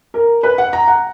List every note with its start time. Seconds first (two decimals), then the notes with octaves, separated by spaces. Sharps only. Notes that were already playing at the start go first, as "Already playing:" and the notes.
0.14 A#4
0.43 B4
0.58 F#5
0.73 A#5
0.88 F#5